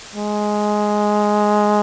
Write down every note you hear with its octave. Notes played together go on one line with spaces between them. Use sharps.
G#3